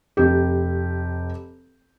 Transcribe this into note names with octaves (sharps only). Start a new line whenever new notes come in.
F1 G4